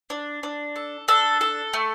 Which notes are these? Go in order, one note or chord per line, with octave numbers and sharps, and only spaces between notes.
D4
D4
A4
D4 A4
A4
A3